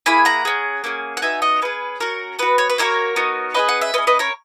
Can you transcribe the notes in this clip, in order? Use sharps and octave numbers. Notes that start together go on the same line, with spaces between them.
A#3 E4 G#4 G#5 B5
F#5 A#5
C#4 G#4
A#3 C#4 G#4
F#5
B3 D#4 F#4 E5 G#5
D#5 F#5
C#4 G#4 B4
C#4 F#4 A#4
B3 F#4 B4
C#5
B4
A#3 D#4 F#4 A#4 C#5
B3 D#4 F#4
C#4 E4 G#4 B4 D#5
F#5
E5
C#4 G#4 B4 D#5
B4 D#5
A#4 C#5